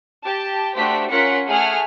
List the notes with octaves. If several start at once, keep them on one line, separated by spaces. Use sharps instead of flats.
G4 A5
A3 D4 F#4 G4 C5 B6
C#4 F4 A#4 F#5 B6 C#7
A3 G#4 E5 F#5 G#5 F6